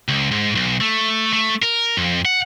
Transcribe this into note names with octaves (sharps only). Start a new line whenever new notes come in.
C#2
G#2
B1
A3
A3
A#4
F2
F#5